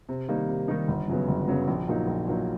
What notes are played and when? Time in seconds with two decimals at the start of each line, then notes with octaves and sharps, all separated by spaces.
0.09 C3
0.28 D#3 G3 A#3 D#4
0.48 C3
0.68 D#3 G3 A#3 D#4
0.88 G1
1.08 F#2 C#3 F#3 B3
1.28 G1
1.48 F#2 C#3 F#3 B3
1.68 A#1
1.87 A#2 F#3 A#3 D#4
2.07 A#1
2.27 A#2 F#3 A#3 D#4